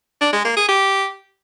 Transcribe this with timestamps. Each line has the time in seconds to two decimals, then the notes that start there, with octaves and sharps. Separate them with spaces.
0.21 D4
0.33 G#3
0.45 A#3
0.57 G#4
0.69 G4